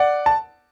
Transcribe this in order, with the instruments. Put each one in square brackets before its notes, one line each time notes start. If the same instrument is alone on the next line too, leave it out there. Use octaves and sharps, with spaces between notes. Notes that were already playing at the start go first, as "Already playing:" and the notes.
Already playing: [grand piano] D5 F#5
A5